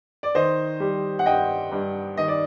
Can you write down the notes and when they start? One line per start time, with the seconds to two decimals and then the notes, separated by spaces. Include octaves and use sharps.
0.23 D5
0.35 D#3 C5 D#5
0.80 G3
1.19 F#5
1.26 G2 D#5 G5
1.72 G2
2.17 D#3 D#5
2.28 D5